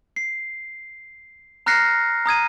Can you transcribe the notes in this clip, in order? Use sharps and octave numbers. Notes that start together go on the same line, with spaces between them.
C7
A#5 F6 F#6 A#6 C7 C#7
A#5 D#6 G#6 D#7